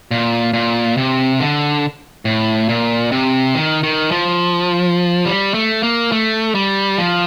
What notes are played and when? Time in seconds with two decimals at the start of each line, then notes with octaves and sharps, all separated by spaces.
0.11 A#2
0.53 A#2
0.97 C3
1.40 D3
2.25 A2
2.69 A#2
3.12 C3
3.55 D#3
3.83 D#3
4.11 F3
5.26 G3
5.54 A3
5.83 A#3
6.12 A3
6.55 G3
6.98 F3